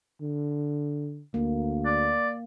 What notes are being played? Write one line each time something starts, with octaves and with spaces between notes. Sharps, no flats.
D3
D2 A#3
D5